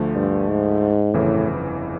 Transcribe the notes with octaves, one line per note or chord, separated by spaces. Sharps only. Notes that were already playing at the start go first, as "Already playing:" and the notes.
Already playing: D2 D3 F3 A3
G2
G#2
G1 F2 A2 C#3 E3